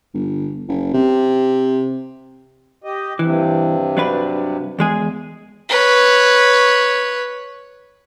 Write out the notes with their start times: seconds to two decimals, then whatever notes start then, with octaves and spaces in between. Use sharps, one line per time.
0.15 G1
0.68 F#1
0.94 C3
2.84 G4 D#5
3.19 G2 C3 E3
3.97 F#3 D4 B4
4.79 E2 G#3 G#4
5.70 B4 C#5